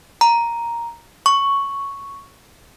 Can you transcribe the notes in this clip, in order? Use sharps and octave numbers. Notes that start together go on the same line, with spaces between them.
A#5
C#6